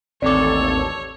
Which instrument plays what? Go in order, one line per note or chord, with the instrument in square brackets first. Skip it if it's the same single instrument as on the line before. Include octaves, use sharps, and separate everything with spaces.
[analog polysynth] A1 D#2 A4 [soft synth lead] C4 [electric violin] C#5 [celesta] D5 D6